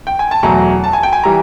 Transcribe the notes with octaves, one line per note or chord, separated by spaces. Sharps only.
G5
G#5
A5
E2 B2 F#3 A3 A#5
A5
G#5
G5
G#5
E3 G3 A#5